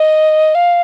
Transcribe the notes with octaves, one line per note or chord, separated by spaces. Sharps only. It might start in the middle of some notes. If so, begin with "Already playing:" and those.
Already playing: D#5
F5